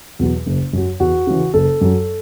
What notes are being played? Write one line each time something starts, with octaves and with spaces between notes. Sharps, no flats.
E2 B2 F#3
F#1
F#2 F#3
E2 F#4
C#3 E3
F#1 A4
F#2 F#3